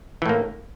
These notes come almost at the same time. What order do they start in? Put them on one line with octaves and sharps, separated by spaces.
E3 A2 A#3